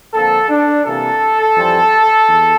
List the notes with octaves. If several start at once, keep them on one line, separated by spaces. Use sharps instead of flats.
F2 D3 F3 A#3 A4
D4
C3 E3 G3 A#3 A4
F2 E3 G3 C4
E2